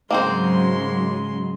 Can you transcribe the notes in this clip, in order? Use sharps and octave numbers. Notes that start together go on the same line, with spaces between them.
G#2 C#3 F#3 G#3 A#3 C4 C5 C6